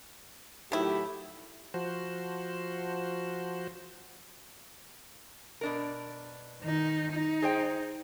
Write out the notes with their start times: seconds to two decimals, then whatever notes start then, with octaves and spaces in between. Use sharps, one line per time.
0.72 A2 D#3 F#3 E4 G4
1.74 F3 F#4 C5
5.61 B2 D4 A#4
6.61 D#3 D#4
7.12 D#4
7.42 G#4 C5 G5